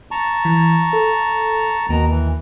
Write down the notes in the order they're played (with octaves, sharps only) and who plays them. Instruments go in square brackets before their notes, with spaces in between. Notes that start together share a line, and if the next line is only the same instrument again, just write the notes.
[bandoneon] A5 A#5 C#6
[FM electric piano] E3
A4
[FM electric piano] D#2 A#3 [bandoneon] B2 A#5
[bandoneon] E3